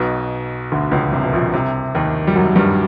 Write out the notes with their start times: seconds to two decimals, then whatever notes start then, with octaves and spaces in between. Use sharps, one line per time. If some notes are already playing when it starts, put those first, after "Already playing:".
Already playing: B1 B2
0.72 D2 D3
0.91 C#2 C#3
1.12 C2 C3
1.23 B2
1.33 A#1 A#2
1.53 C2 C3
1.95 D#2 D#3
2.27 G3
2.35 F#2 F#3
2.56 G2 G3